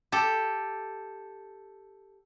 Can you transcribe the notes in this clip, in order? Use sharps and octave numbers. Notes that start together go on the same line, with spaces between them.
G4 A4